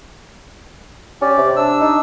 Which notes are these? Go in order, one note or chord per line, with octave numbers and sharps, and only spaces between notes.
C#4 G4 D5
C3
D4 E6
D#4